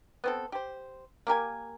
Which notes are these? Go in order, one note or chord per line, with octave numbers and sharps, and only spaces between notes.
B3 C4 A4
G4 C5
A#3 G4 A#4 G#5